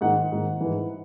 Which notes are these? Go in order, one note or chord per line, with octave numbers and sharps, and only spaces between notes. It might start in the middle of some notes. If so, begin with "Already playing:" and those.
G#2 D#3 F#5
G#2 D#3
E3
G#2